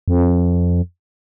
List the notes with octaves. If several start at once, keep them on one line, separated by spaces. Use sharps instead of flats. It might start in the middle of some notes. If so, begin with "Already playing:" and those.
F2